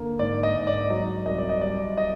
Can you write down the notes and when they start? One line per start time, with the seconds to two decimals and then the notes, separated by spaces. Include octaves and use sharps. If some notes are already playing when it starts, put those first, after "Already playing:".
Already playing: D3 A#3
0.19 G#2 D5
0.43 D#5
0.55 G#2
0.67 D5
0.90 F#3 D#5
1.26 C2 D#5
1.38 D5
1.49 D#5
1.61 G3 D5
1.97 D#5